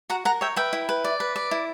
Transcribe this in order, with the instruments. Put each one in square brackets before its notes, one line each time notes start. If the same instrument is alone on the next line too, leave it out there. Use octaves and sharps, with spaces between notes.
[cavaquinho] F#4 F#5 A#5
A#4 F#5 A#5
C#5 E5 G5
B4 E5 G5
E4
B4
D5
B4
D5
E4